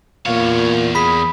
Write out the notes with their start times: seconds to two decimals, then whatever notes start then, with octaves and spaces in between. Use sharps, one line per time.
0.26 E2 A#2 C#5 F5
0.95 G#4 B5 B6